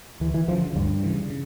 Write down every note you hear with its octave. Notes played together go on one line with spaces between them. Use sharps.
D2 E3
E3
C#3 E3 F3
D3
D2 G2
C#3 E3
C#3